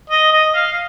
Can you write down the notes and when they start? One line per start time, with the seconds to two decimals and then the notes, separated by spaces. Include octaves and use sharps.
0.10 D#5
0.33 D#5
0.55 F5